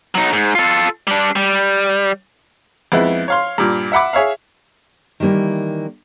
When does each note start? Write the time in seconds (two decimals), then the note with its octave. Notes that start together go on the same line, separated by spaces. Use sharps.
0.15 F#3 D#4
0.33 G#2
0.55 F4 A4
1.07 G3 D4
1.36 G3
2.92 F2 G#3 B3 E4
3.28 C#5 F5 C6
3.58 G2 A#2
3.92 E5 F#5 B5 D6
4.13 G#4 C#5 E5 F5
5.20 D#3 E3 G3 A#3 E4